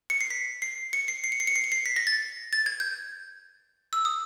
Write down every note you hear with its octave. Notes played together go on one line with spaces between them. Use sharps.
C#7
C7
B6
C7
C#7
C7
C7
C#7
C7
C#7
C7
C#7
C7
B6
A#6
A6
A6
G#6
G6
E6
D#6